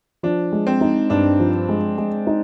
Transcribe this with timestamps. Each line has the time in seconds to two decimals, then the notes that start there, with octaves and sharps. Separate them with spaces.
0.23 F3 D4
0.52 G#3
0.67 C4
0.81 D#4
1.10 G2 D4
1.40 F3
1.69 G#3
1.98 G#3
2.27 D#4